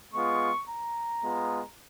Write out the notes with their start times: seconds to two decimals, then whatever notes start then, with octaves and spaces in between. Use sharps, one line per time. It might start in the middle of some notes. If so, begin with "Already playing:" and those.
0.13 G#3 B3 F4 C#6
0.69 A#5
1.23 G#3 B3 F4